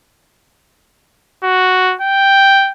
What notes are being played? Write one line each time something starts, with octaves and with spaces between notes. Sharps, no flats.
F#4
G5